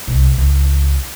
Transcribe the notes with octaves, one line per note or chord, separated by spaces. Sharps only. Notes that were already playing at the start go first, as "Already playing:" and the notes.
C2 B2
C#2